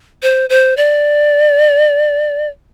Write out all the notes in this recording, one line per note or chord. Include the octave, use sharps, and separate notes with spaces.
C5
C5
D5